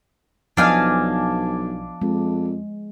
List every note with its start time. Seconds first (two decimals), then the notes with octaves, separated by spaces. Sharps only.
0.57 B1 F3 B3 D4 D#5 F5 G#5
2.02 F2 G#3